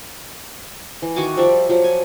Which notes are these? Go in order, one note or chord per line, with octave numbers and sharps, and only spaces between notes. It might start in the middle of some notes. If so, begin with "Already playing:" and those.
E3
D#3 F#4 G#5 D6
F3 G3 D5 E5
F3 F#3
G#5